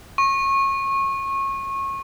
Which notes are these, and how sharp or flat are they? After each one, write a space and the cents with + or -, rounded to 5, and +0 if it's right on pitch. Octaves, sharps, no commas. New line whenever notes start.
C#6 -25